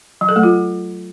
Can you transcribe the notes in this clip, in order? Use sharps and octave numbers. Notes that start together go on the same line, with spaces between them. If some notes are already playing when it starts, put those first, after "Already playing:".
F#3
A4
A3
F4